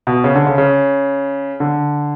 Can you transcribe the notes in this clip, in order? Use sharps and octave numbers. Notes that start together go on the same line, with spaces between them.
B2
C#3
D3
C#3
C#3
D3